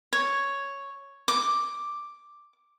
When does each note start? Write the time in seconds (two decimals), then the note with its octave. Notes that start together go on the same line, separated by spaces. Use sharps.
0.13 C#5
1.28 D6